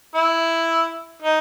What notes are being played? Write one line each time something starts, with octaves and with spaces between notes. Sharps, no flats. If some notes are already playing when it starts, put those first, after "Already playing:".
E4
D#4